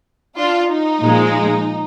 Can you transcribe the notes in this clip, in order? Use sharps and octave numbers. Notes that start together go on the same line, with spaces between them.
D4 F4
D#4
A#2 F3 G#3